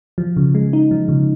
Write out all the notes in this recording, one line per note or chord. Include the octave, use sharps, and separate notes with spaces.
F3
C#3
G#3
D#4
F3
C#3